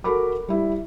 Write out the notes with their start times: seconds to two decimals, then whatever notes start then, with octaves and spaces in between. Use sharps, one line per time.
0.04 F#4 A4 A#4 B5 D6
0.48 G3 E4